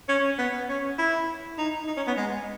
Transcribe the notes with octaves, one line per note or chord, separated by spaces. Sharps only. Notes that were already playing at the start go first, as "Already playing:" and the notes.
C#4
B3
C#4
E4
D#4
D#4
C#4
B3
G#3